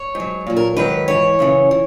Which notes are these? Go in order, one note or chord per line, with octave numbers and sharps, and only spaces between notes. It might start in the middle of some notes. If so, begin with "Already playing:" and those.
Already playing: C#5
G#2 F#3
A#2 F#3
A#4
G#2 D#3 F#3 B4
G#2 E3 C#5
F#2 C#3 E3
E3